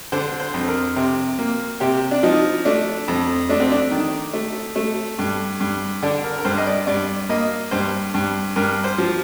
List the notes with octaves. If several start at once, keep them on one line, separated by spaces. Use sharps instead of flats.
D3 C5
C5
F2
A#4
C3
A#3
C3 G4
D4
F3 D#4
A3 D4
F2
A3 D4
C4
D4
D#3
A3
A3
G2
G2
D3 D4
A#4
A#4
G2 C5
D#5
D5
G2 D5
A#3 D#5
G2 C5
G2
G2 A#4
C5
F3